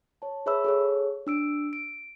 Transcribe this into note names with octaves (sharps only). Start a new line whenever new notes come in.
C#5 A5
G#4 B4 C#5 E5 B5 E6
G#4 A4 C#5
D4 E6 D7
D7